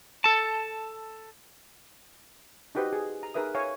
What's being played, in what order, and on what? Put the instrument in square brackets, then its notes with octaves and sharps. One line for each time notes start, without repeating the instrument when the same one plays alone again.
[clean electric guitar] A4 A5
[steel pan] D#4 F#4 G4 B4 C5 D#5
G#4
A#5
D#4 G#4 A#4 B4 E5 D#6
C#5 E5 F5 G#5